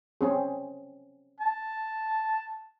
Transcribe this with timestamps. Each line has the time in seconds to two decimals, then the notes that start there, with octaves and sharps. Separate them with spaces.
0.21 C4 C#4 G#4
1.40 A5